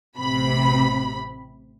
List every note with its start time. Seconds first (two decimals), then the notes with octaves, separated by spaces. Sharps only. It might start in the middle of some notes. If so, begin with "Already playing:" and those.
0.18 A1 C3 B5